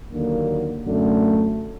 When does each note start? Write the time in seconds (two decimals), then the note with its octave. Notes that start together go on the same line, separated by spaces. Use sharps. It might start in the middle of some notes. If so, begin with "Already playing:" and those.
0.11 D#2 D3 F#3 A#3
0.85 F#2 D3 F#3 A3